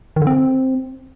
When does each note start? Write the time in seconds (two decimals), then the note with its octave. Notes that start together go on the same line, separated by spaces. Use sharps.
0.16 D#3
0.22 D3
0.27 C4